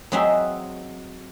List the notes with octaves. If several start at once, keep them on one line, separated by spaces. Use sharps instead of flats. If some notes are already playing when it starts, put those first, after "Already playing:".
F#3 C4 D#4 F#4 G#4 E5